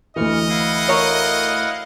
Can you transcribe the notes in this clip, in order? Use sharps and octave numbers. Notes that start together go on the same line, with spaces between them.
D2 E3 D#5 C#6 F6
E4 F5 F#5
A#4 C#5